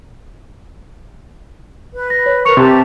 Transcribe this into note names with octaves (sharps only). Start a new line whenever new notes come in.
B4
A#6
C#5
A#4 B4 C#6 C#7 F7
C3 G4 A5 C6